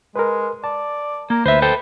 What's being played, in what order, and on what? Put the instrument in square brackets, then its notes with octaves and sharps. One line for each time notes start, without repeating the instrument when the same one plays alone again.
[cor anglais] G#3 [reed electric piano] A#4 B4
[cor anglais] D5 [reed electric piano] A5
[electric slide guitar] A#3 [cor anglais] A#4
[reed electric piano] D2 [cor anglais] B4 [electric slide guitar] C5 E5
[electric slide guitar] A4 C5 G5